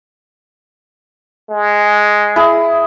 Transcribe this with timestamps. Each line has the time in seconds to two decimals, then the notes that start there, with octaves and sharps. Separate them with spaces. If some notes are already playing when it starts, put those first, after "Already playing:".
1.50 G#3
2.36 E4 G#4